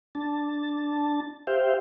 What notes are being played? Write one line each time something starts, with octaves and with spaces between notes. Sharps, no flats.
D4 A5
G4 C5 E5 F5 G5